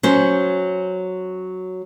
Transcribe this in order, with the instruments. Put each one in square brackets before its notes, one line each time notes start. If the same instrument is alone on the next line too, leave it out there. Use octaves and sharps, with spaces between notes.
[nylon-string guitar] F#3 C#4 C5